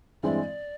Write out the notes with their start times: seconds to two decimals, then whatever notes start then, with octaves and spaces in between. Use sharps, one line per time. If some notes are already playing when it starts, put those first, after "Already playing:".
0.23 G2 E3 G#3 C4 E4 D5